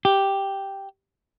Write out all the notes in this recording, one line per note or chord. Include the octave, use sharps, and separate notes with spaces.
G4